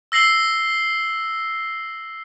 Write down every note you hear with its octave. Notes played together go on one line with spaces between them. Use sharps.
E6 A#6 C7 F#7 G7